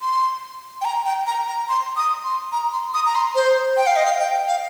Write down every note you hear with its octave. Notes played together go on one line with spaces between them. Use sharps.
C6
G5
A#5
G5
A#5
A#5
C6
D#6
C6
A#5
C6
D#6
A#5
C6
C5
G5
F5
D#5
F5
G5
F5